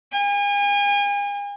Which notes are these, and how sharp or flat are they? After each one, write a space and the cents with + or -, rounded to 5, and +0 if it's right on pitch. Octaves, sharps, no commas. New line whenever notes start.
G#5 -40